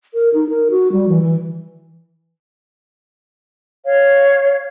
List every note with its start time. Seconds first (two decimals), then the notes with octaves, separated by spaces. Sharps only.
0.14 A#4
0.34 D#4
0.49 A#4
0.71 F#4
0.92 G3
1.08 E3
1.22 E3
3.85 C#5 F5